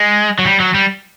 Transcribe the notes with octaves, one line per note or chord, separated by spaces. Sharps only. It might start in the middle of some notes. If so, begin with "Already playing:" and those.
Already playing: G#3
F#3
G3
F#3
G3